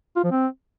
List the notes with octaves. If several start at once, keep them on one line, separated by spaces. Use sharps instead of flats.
F4
F3
C4